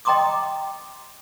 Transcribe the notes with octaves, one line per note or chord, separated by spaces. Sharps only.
D#5 G5 A#5 C6 D6 D#6